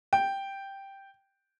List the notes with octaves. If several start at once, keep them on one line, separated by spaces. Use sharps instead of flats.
G5